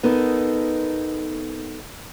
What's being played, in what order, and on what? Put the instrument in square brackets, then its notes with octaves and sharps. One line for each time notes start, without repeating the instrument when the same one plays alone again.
[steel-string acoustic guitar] B3 D#4 A4 A#4